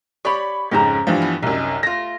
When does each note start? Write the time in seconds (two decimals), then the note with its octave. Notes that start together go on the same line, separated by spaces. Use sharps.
0.25 G4 C#5 D5 B5 C#6
0.71 F2 G#2 C#3 C#4 C5 A#5
1.07 G2 E3 F3
1.22 A2 B3
1.42 C2 F#2 D#4
1.83 A3 F4 A#6